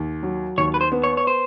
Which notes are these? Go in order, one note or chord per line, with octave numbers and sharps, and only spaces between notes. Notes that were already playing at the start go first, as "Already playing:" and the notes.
Already playing: D#2
F#3
D#2 C#5
B4
C5
B3
C#5
C#5
C5